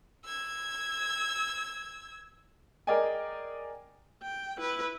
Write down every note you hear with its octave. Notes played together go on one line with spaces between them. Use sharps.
E6 G#6
G#4 A#4 D5 D#5 G5 G#5
G5
E4 B4